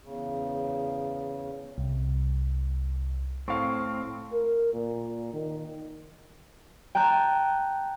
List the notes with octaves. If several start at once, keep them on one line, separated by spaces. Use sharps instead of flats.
E2 C#3
C2
A2 C4 F5 C#6
A#4
A#2
D#3
G5 A5 A#5 F#6